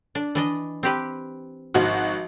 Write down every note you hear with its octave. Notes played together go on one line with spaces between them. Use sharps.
D4
E3 D4 D#5
C4 G4 B4
G#1 F3 F#4